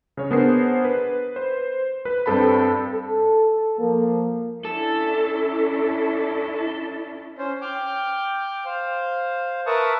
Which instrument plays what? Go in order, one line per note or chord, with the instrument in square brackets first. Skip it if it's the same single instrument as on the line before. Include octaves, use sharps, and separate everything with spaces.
[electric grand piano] C#3 C#5
B3 D4 G#4 A#4 C5 C7
B4
C5
B4
G2 C4 A4 A5 B5
[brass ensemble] A4
F3 A#3
[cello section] C#4 D4 E4 [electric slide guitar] A4
[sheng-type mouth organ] C#4 C5
G5 D6 F6 G6
C5 F5
A#4 B4 E5 A5 C#6 D#6